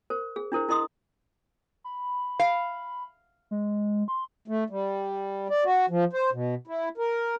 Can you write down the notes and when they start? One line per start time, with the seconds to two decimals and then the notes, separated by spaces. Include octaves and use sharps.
0.10 A#4 C5
0.36 G#4
0.52 D4 E4 A#4 C5
0.69 E4 A#4 D#5 C6 D#6
1.84 B5
2.40 F5
3.51 G#3
4.08 C6
4.48 A3
4.70 G3
5.50 D5
5.64 F#4
5.90 F3
6.13 C5
6.32 B2
6.67 E4
6.98 A#4